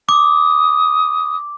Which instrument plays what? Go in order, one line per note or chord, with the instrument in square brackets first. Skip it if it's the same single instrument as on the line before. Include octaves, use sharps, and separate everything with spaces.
[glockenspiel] D6 [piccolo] D#6